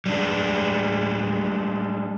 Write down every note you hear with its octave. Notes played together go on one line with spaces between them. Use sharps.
G3 G#3 D4